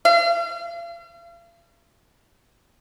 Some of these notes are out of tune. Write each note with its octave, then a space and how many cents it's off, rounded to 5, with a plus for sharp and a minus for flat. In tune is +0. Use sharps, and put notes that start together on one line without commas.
F5 -45